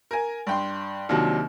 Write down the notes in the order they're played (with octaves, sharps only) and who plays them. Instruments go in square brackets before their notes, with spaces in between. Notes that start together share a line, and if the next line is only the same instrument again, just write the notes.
[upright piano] A#4 G#5
G2 G5 C6
[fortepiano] D#2 C3 [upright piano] F3 F#3 D4